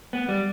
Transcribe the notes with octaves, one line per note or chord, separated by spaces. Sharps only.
B3
G3